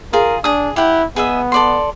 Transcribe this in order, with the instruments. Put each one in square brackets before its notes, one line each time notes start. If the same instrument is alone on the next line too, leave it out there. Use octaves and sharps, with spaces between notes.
[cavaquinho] F4 G#4 [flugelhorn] A#4
[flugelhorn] D4 [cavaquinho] G#4 D#6
[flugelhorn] E4 [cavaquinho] G4 F#5 G5
[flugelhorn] B3 [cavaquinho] G#4 D#5 E5
[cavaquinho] A4 D5 C6